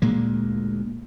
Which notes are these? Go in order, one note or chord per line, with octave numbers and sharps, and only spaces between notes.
D2 A#2 G#3 A#3